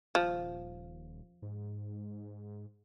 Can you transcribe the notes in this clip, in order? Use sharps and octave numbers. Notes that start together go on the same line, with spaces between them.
D#1 F3
G#2